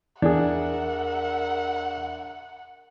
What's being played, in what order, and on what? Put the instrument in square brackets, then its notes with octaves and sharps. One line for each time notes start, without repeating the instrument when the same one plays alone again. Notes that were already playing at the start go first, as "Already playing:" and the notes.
[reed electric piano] E2 G#4 [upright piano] D4 [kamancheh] A#4 E5 [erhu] F#5